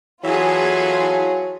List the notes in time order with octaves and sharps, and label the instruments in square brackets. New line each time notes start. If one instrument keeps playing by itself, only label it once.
[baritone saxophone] E3 [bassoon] F#3 [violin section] F4 G#4 A4